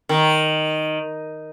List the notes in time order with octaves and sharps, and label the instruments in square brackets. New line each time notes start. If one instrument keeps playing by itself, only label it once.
[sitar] D#3